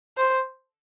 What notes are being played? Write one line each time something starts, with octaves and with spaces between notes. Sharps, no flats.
C5